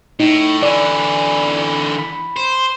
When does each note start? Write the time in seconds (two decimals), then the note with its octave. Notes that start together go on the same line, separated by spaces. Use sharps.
0.20 A2 D#4
0.62 D3 E3 D5
1.98 B5
2.36 C5